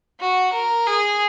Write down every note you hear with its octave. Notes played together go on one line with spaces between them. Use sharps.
F#4
A#4
G#4